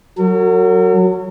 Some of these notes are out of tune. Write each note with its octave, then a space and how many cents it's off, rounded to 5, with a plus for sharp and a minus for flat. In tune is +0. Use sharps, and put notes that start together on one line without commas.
F#3 +0 A#4 -45